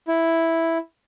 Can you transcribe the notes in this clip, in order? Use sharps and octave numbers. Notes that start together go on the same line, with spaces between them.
E4